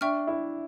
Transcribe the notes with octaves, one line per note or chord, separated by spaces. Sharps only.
D4 E5 G5 C#6 F6
E4